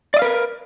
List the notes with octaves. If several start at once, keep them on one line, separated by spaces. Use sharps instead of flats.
A#4 B4 D5 D#5 F5